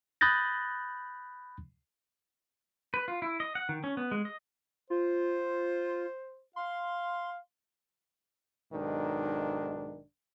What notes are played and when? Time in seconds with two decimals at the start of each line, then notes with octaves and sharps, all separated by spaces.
0.21 B5 D#6 F#6 G6 A6 A#6
2.94 B4
3.08 F4
3.22 E4
3.40 D#5
3.55 F#5
3.69 D#3
3.84 C#4
3.97 B3
4.11 G#3
4.25 D#5
4.90 F4 C5
6.56 F5 C6
8.72 B1 G#2 D#3 D4